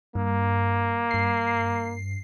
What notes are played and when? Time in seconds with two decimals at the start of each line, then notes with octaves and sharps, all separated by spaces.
0.15 G2 A#3
1.11 G2 C7